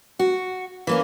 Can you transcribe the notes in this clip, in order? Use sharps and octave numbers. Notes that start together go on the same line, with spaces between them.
F#4
E3 A#3 C#4